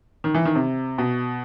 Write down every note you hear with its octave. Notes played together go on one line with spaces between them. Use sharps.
D#3
E3
D#3
C3
B2